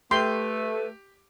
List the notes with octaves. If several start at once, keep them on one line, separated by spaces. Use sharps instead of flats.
A3 G4 B4 C6